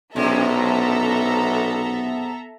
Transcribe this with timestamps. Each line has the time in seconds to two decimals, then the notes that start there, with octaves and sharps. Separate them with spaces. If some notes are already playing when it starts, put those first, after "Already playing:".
0.16 B1 F#2 C3 G#3 B3 A4 E5 A#5